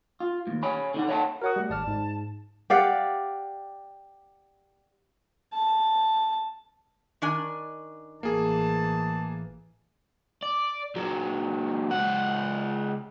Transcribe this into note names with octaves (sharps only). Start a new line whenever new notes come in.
F4
D#2 G#2
C#5 G#5 B5
D3 D#4 F#5
C#5 E5 F#5 A5
F#4 A#4 C#5 D#6
G3 A3
G#1 D5 A5 F6
G#2
G4 D5 F5 F#5
A5
D#3 D4 G#5
A1 E3 A#3 G#4 A5
D5
A#2 F#3
C#2 F#5